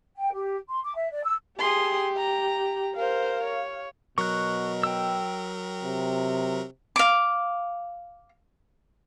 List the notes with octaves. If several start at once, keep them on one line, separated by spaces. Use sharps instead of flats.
G5
G4
C6
D6
E5
D5
E6
G4 G#4 C6
A#5
A#4 C5 F5
C#5
B2 F#3 A#4 C#6 F#6
G5 E6
C3
F5 D6